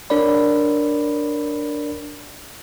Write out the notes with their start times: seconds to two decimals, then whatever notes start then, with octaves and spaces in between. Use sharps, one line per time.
0.10 D4 A#4 C#5 D5 B5